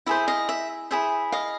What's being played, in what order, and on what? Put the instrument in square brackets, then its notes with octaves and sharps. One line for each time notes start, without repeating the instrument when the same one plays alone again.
[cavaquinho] E4 G#4 C5 E5
D#5 F5
E5
E4 G#4 C5 E5
D#5 F5